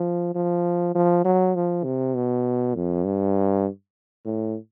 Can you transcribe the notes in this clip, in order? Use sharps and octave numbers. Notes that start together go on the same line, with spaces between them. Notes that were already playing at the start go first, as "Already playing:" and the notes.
Already playing: F3
F3
F3
F#3
F3
C3
B2
F2
G2
A2